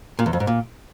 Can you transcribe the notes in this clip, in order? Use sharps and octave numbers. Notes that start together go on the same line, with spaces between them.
A#2
E2
F2
G#2
A#2